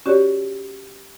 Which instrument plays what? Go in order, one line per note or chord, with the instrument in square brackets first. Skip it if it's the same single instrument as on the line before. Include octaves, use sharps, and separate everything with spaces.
[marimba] C#4 F#4 G4 C#5 D5